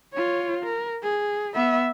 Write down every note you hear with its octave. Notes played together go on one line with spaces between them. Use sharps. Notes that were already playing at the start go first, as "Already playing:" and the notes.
F4 C#5
A#4
G#4
B3 E5